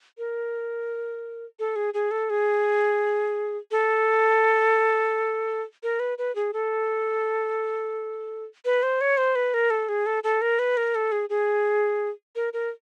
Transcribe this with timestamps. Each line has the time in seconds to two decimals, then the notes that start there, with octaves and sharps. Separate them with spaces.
0.18 A#4
1.59 A4
1.76 G#4
1.94 G#4
2.11 A4
2.30 G#4
3.71 A4
5.83 A#4
6.00 B4
6.18 B4
6.35 G#4
6.53 A4
8.65 B4
8.83 C5
9.01 C#5
9.17 C5
9.35 B4
9.54 A#4
9.70 A4
9.89 G#4
10.06 A4
10.24 A4
10.42 A#4
10.59 B4
10.77 A#4
10.95 A4
11.12 G#4
11.30 G#4
12.36 A#4
12.53 A#4